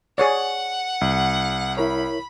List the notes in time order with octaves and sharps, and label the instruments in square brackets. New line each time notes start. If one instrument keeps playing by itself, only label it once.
[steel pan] G#4 C#5 D5 [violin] F#5
[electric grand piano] C2
[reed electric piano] E4 A#4 C#5 [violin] B5